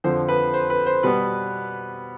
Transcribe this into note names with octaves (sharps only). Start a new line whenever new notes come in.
F2 D3 F3 C5
B4
C5
B4
C5
B2 G3 B3 B4